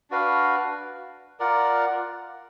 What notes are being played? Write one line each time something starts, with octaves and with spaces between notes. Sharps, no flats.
D4 F#4 B4 F5
F4 A#4 D5 F#5